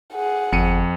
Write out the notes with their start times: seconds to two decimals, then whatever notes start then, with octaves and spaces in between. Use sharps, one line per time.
0.14 G#4 F#5
0.52 G1 F2 C#7 D#7